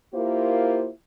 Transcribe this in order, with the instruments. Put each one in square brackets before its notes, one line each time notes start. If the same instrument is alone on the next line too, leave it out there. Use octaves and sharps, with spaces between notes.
[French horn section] A#3 E4 F4 G4 A#4 C5